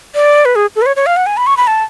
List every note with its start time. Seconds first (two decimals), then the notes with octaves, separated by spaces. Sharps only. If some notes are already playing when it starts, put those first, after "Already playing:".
0.15 D5
0.45 B4
0.56 G#4
0.76 A4
0.82 B4
0.86 C#5
0.96 C#5
1.06 F5
1.17 F#5
1.26 G#5
1.37 B5
1.47 C#6
1.57 B5
1.67 A5